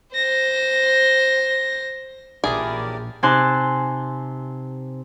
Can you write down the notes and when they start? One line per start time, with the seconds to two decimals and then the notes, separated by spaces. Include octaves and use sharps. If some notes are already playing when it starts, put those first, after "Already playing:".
0.14 C5 A#6
2.44 A#1 E3 C#4 D4 G4 G#4 A#4 D5
3.23 C3 D#4 G#5 A5 C6 F#6